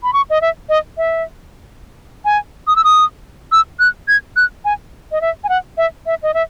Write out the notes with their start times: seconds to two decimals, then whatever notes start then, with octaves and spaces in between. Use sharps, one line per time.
0.03 B5
0.13 C#6
0.30 D#5
0.41 E5
0.69 D#5
0.97 E5
2.25 G#5
2.67 D#6
2.76 E6
2.84 D#6
3.52 E6
3.80 F#6
4.08 G#6
4.36 F#6
4.65 G#5
5.12 D#5
5.21 E5
5.44 G#5
5.49 F#5
5.78 E5
6.06 E5
6.23 D#5
6.34 E5